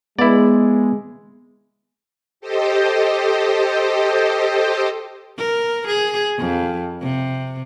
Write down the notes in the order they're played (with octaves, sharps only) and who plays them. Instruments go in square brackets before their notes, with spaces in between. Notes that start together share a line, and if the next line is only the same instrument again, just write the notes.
[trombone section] G#3 [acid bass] B3 [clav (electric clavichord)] E4 D5
[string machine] G4 A4 C5 D#5
[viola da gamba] A#4
G#4
F2
C3